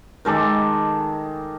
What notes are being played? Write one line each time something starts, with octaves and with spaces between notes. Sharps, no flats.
D#3 G#3 A4 D6